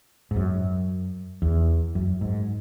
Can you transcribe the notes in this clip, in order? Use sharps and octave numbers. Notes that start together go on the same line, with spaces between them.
G#2
F#2
E2
F#2
G#2